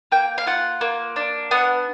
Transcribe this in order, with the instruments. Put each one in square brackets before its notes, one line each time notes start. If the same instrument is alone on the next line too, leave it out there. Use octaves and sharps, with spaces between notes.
[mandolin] A#3 G5
F5
F4 F#5
A#3
D4
B3 F#5